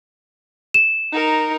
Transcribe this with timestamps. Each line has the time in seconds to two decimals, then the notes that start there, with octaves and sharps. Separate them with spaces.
0.74 E7
1.12 D#4 A#4